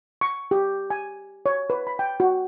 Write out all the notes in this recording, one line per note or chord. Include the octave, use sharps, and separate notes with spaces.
C#6
G4
G#5
C#5
B4
B5
G5
F#4